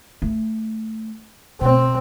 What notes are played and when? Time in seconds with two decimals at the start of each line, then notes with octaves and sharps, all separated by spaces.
0.22 A3
1.61 B2 C4